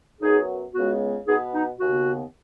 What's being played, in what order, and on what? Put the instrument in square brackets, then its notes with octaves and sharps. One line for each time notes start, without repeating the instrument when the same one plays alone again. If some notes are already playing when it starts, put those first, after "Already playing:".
[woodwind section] F#2 F#3 B3 D#4 G#4
C#2 C#3 G#3 B3 F#4
B2 B3 D#4 G#4
D#4
D#2 C#3 B3 F#4